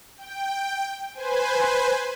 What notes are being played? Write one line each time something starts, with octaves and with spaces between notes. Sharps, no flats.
G5
B4 C5 G#5